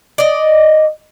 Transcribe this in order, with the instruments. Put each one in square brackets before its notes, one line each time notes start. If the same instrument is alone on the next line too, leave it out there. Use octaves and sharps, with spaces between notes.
[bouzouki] D5 D#5